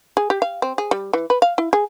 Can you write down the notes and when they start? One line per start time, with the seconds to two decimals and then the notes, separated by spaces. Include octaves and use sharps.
0.17 G#4
0.30 G4
0.42 F5
0.62 C4
0.78 G#4
0.91 G3
1.13 E3
1.30 B4
1.42 F5
1.58 E4
1.73 G#4